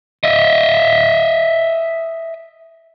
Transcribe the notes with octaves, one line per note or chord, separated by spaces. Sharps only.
D#5 E5